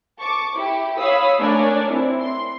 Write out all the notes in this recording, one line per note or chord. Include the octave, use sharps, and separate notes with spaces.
A5 C#6 D6
E4 G4
C#5 F5 B5 D#6 E6
A3 D4 A#4 C#5 D5 G#5
C4 E4
C6